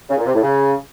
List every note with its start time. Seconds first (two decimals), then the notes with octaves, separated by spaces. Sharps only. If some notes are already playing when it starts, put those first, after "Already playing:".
0.10 C#3
0.18 A#2
0.26 C3
0.34 A2
0.43 C#3